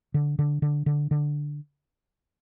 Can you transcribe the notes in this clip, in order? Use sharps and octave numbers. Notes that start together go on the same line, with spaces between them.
D3
D3
D3
D3
D3